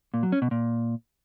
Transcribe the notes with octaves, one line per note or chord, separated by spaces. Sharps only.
A#2
F#3
C#4
B2
A#2